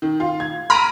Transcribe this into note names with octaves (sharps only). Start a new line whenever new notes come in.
D#3
F4
G#6
A#5 B5 F6 D7 D#7